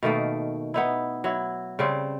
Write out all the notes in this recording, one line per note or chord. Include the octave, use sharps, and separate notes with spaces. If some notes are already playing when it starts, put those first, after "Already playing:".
B2 D#3 A3 A#3
B3 D#4 E4
F#3 E4
C#3 G3 C4